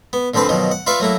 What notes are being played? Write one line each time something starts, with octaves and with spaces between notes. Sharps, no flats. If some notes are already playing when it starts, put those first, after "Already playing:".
B3
A#2 D3 F3 C4 B4 B5
B2 D#3 F3 F#3
F#5
F4 B4 D5 E5 F5 C#6
F#3 A3 A#3 E4